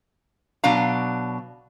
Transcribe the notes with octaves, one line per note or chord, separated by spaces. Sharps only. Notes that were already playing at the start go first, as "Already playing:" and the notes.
B2 F#3 D4 F5 A#5